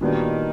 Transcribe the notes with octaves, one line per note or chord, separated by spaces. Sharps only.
A#2 D#3 G3 B3 D4 F#4